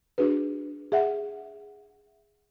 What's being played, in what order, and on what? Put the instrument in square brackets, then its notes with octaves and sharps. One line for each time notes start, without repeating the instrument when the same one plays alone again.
[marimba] D4 F#4 G#4 B4
G#4 E5 F#5